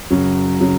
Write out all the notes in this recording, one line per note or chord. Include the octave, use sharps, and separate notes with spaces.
F#2 C#3 F#3
C#3 F#3